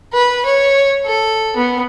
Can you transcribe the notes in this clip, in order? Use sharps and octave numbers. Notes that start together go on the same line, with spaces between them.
B4
C#5
A4
B3